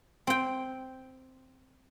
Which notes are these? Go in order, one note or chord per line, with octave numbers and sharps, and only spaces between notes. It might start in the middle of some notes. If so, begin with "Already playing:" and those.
C4 G5